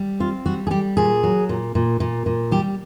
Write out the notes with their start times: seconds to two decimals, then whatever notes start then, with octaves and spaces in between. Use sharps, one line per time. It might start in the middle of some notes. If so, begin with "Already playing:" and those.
Already playing: G3
0.20 C4 F4
0.46 G3 F#4
0.67 G#4
0.71 G3 G4
0.97 A#2 G#4
1.23 F#3
1.49 A#2
1.75 A#2
2.00 A#2
2.26 A#2
2.51 G3 G4